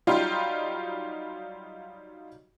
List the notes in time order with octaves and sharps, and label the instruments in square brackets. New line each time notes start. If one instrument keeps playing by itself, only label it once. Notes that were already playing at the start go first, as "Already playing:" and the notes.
[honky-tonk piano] F#3 G3 D#4 F4 G4